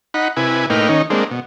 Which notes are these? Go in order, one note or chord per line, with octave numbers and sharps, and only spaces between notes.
D#4 F#5 B5
C3 E4 B4 G#5
A2 A#3 D#4 B4 G5 F6
D#3 C#4 D#4
G#3 A#3 C4 D4
B2